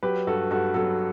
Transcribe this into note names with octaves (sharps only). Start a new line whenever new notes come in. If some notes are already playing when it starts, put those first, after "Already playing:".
F#3 G4 B4
G2 F#4 A4
G2 F#4 A4
F#3 F#4 A4